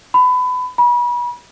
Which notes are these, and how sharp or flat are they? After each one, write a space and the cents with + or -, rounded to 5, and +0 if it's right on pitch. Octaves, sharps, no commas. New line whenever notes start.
B5 +25
B5 -35